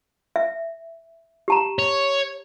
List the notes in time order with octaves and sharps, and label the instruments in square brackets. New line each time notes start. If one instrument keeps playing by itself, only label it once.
[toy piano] E5
G4 A5 A#5
[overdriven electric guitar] C#5